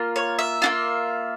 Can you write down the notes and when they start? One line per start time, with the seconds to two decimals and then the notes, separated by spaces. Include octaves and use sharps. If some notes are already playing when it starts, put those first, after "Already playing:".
Already playing: A#3 F4
0.16 C#5
0.39 E5
0.62 A#3 C#4 F4